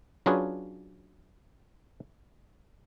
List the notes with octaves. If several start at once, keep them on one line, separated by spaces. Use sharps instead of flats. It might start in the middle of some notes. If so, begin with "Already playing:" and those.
F#3 C#4 D4 F4 G#4 B4